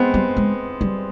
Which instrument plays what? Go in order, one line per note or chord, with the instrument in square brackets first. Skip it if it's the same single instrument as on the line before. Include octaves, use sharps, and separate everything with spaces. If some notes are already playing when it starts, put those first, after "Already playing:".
Already playing: [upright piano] G#3 B3 C4
[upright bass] G3
G#3
G3